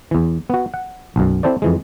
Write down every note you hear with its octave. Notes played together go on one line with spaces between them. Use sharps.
E2 E3
B3 F#4
F#5
B1 F#2
C4 E4 A4 C5 D5
F2 E3 G#3